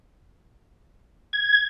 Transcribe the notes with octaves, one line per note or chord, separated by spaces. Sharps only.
G#6